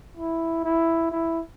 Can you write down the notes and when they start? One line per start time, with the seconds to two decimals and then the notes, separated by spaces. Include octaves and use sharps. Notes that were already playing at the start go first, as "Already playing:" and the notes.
0.17 E4
0.64 E4
1.12 E4